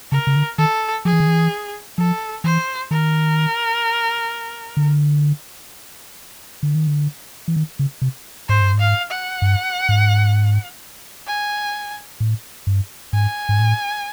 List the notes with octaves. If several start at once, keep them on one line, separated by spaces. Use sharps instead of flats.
C#3 A#4
C#3
D3
D#3 A4
F3 G#4
E3
D#3
E3
F3 A4
E3 C5
D#3 A#4
D3
D3
D#3
D3
E3
D#3
C#3
C3
G#2 C5
G2
G#2
F5
F#5
G2
G#2
G#5
A2
G2
G#2 G#5
G#2
A2